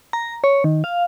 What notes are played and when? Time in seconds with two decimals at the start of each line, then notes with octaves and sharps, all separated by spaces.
0.13 A#5
0.44 C#5
0.64 D#3
0.84 F5